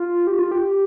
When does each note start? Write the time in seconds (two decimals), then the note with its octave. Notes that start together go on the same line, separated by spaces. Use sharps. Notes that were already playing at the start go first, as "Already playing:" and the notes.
Already playing: F4
0.27 G4
0.39 F4
0.51 G4